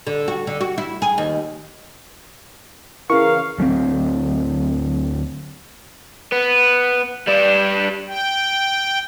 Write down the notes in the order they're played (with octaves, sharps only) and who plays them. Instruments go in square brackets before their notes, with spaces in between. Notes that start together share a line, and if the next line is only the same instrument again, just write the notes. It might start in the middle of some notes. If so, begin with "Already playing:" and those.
[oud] D3
F#4
D3
F#4
E4
G#4
D#2
[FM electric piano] C#3 E3 [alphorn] A#4 [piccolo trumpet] F5 [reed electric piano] C#6
[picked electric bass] D2 F#3 G#3 C4
[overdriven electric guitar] B3
G3 D4
[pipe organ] G5